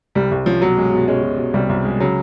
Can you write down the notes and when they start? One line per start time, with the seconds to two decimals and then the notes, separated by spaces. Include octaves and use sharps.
0.15 C2 G3
0.31 C2
0.46 F3 C#4
0.62 B2 F#3
0.77 G#3
0.93 B2
1.08 G#3 C#4
1.23 B2
1.38 B2
1.53 C2 G3
1.69 C2
1.85 G#3
2.00 C#3 F#3